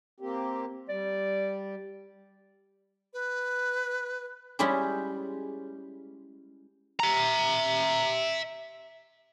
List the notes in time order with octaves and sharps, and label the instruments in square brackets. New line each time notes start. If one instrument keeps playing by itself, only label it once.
[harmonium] A#3 C4 G4
[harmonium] G3 [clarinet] D5
[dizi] B4
[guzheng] G3 G#3 C#4 E4 G4 G#4
[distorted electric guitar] E5 A#5